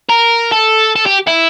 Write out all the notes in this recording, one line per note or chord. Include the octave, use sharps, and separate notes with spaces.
A#4
A4
A4
G4
E4